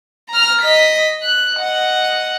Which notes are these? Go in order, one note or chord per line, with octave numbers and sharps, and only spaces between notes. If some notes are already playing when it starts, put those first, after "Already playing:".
A#5 F6
D#5 B6
F#6
D#5 F#5